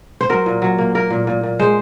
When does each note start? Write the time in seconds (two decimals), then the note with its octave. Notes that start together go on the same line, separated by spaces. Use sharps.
0.21 C5
0.29 F#3 A#4
0.46 A#2
0.62 F#3
0.78 A#3
0.95 A#3 A#4
1.10 A#2
1.27 A#2
1.43 A#2
1.59 G#3 C5